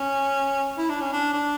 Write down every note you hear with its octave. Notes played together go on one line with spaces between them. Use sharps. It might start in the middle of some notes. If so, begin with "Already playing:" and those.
Already playing: C#4
E4
D4
C#4
D4
D4